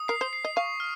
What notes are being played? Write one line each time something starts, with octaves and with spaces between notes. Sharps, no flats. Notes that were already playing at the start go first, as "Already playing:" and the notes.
Already playing: D#6
A#4 C7
C5
C7
D#5
F5 C#6
F6